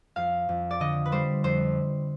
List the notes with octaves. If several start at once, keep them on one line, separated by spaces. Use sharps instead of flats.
F2 F5
F2
D5
D3 D#5
B4
G3 C5
F2 C5